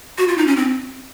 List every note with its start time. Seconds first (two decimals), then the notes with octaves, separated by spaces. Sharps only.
0.18 F#4
0.28 F4
0.38 D#4
0.47 C#4
0.57 C4